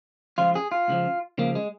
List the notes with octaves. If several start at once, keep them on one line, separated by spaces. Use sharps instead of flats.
C#2 C#3 F3 F4
G#4
F4
C#2 C#3 F3
C#2 C#3 F3 A#3
G#3